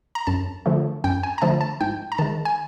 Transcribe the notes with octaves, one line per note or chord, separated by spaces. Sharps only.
A#5
F#2 A5
D3 F3 A3
F#2 G5
G#5
A#5
D3 F3 A3 A5
A5
G#2 G5
A#5
D#3 G#3 A5
G#5